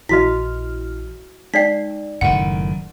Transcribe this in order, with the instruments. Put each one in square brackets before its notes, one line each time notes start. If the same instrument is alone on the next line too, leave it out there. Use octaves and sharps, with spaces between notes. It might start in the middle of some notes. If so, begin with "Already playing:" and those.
[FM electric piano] A#1 E3 F6 [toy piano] E4 F#4 D#5 [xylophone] B6
[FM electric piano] G#3 [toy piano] D#4 D5 G5 [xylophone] B6 C7
[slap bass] F#1 A2 D#3 [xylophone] F#5